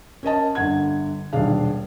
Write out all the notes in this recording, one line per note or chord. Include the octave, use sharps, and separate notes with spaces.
C#4 A#4 D#5 A5
G1 D3 F#5 G#6
D#1 B1 D4 G#4 F5